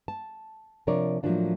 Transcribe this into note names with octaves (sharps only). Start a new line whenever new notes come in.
A5
C3 F3 D4 A#4 C#5 D5
A2 F3 F#3 A#3 D4 F4